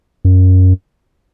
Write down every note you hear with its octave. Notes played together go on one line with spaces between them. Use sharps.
F#2